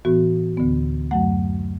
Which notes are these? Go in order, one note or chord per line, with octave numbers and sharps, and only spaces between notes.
A2 E3 B3 F#4
D2 D3 B3
F#2 F#3 A3 F#5